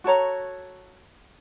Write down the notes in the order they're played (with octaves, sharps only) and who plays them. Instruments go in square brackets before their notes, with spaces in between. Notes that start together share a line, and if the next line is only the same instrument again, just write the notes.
[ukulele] F#4 A4 C#5 A#5